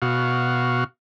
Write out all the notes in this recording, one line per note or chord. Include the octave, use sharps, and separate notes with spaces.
B2 F#4 F5